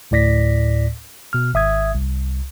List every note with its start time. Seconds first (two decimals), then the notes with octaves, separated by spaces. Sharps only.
0.11 D2 A2 D5 A#6 B6
1.33 B2 F6
1.54 G#1 E5 D#6 G#6
1.95 C2